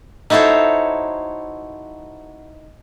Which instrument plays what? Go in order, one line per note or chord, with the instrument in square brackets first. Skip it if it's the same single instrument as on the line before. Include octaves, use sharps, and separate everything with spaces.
[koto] D#4 E4 F#4 A4 C5 C#5